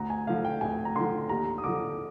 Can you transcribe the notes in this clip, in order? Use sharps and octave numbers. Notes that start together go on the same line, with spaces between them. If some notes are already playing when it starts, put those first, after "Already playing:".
Already playing: D2 A#5
G#5
D3 F3 F5
G5
D2 G#5
A#5
D3 F3 C6
D#2 A#5
D#6
D3 F3 D6